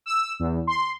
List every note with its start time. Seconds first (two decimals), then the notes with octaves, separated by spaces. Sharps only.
0.06 E6
0.40 E2
0.67 C6